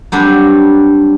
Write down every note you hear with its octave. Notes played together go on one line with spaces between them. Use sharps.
F#3 G3 C4 D4